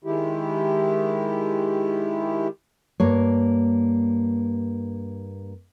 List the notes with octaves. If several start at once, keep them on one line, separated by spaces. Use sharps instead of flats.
D#3 G#3 E4 G4
G2 A#3 C#5